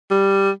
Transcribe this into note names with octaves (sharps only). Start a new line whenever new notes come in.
G3